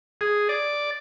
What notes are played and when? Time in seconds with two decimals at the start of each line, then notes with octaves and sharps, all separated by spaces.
0.21 G#4
0.49 D5